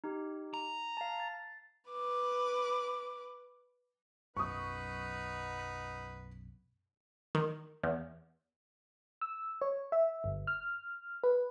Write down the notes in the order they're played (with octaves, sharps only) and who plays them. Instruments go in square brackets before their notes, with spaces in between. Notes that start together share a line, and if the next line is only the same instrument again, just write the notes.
[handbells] D#4 G4
[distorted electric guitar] A#5
[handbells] F5 A5
A6
[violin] B4 D6
[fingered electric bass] B1 F#2 [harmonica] D#4 B4 F#5 [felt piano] C#6 D#6
[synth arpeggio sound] D#3
E2
[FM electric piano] E6
C#5
E5
G1
F6
B4